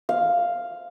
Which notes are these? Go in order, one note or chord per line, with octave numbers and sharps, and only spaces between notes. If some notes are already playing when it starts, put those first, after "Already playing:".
F5